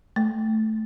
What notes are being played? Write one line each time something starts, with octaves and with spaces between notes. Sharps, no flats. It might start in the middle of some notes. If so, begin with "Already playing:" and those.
A3